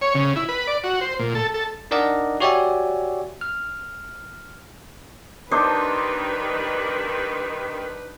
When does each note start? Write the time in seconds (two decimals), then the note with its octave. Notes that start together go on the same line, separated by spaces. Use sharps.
0.01 C#5
0.15 C#3
0.36 E4
0.49 B4
0.67 D5
0.84 F#4
1.01 C5
1.19 A#2
1.35 A4
1.54 A4
1.91 D4 D#4 A#4 D5 D#5 F#5
2.40 F#4 G4 C#5 D5 E5 G#5
3.41 F6
5.51 G2 D#3 D4 D#4 B4 C5